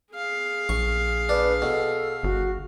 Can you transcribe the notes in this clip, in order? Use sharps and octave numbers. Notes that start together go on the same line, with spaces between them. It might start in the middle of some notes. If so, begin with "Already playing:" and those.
G#4 F5
A#1 C#6
D4 B4
B2 A4
G1 F#4